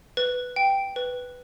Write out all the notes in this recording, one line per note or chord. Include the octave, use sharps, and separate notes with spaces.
B4
G5
B4